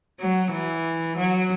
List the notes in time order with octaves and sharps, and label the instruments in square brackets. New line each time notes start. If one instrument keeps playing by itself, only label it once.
[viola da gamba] F#3
E3
F#3